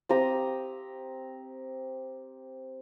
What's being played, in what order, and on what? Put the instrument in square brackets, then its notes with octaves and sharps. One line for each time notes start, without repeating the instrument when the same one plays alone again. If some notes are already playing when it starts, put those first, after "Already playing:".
[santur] C4 G4 A#5 D#6